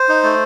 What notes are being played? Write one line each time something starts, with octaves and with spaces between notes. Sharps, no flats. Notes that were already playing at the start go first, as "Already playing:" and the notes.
Already playing: C5
D#4
A3